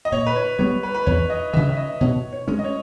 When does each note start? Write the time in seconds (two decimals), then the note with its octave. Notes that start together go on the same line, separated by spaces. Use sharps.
0.05 D#5
0.12 A#2 C#5
0.26 B4
0.36 C#5
0.58 G3 B3 C#5
0.83 B4
0.94 B4
1.06 E2 C#5
1.30 D#5
1.53 C#3 E3 E5
1.69 E5
1.77 D#5
2.01 B2 C#5
2.33 C#5
2.48 G#3 C#4
2.59 D#5
2.64 C#5